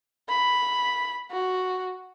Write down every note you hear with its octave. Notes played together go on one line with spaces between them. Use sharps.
B5
F#4